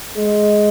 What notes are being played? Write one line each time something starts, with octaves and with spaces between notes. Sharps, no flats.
G#3